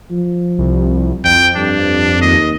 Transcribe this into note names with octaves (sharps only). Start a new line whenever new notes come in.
F3
C2
F2 G5
G2 D4
D#2 D#5